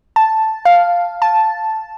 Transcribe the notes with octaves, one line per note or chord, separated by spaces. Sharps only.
A5
F5
A5